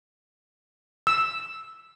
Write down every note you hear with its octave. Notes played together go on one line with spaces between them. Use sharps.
E6